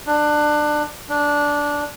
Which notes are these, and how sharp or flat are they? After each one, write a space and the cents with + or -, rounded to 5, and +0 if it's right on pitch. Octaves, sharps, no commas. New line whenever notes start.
D4 +20
D4 -10